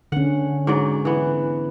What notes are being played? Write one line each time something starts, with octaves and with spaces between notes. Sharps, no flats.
D3 C#4 F#5
G#2 F#3 D5
E3 B3